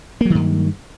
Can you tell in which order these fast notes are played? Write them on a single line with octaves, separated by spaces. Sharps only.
A#3 F#3 D#3 G2